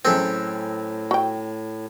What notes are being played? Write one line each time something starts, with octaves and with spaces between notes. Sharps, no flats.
F#2 A2 C4 G#4 A4
F#4 G5